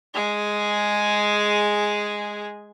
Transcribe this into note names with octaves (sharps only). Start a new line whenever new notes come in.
G#3 G#4